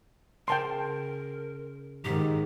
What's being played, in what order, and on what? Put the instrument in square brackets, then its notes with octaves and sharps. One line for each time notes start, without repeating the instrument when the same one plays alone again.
[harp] C#3 [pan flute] A#4 [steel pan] G5 A5 C6
[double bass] G#2 D#3 [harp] G#3 [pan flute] G4